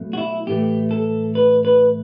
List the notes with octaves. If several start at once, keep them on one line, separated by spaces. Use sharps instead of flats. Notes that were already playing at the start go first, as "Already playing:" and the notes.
Already playing: B2 F#3 A3
F#4
E4
A2 E3 A3 G4
A4
B4
B4